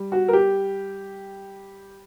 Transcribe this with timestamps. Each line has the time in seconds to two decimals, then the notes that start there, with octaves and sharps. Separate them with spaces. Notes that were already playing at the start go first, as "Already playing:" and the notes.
Already playing: G3
0.12 F#4
0.28 A#4
0.33 G4